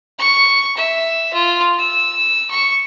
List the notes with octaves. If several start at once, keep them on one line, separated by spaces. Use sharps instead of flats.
C#6
E5
F4
E6
C#6